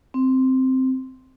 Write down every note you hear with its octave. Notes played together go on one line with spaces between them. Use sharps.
C4